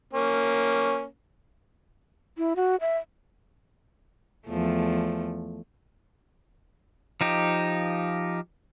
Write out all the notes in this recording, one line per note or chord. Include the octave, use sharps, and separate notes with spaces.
A#3 C#4
E4
F#4
E5
E2 F3 A3
F3 D#4 G4